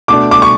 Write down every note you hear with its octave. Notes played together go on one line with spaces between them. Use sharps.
B2 A3 D4 D6
D6
C#6